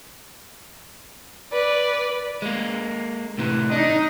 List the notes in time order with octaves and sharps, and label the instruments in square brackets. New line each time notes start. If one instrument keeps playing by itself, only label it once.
[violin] B4 D5
[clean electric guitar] G#3 A#3
A2 C3 E3
[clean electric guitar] D4 [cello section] D#4 D#5